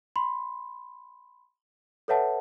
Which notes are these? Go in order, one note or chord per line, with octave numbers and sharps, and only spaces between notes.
B5 C6
A4 B4 C#5 E5 F#5 A5